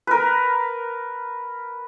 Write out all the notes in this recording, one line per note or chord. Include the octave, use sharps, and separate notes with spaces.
A#4 B4